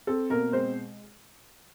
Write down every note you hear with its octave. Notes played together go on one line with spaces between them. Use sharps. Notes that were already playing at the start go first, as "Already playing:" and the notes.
C4 A4
B2 A#3 A#4
G#3 C4 C5